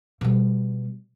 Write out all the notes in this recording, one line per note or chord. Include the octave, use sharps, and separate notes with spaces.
B2 G3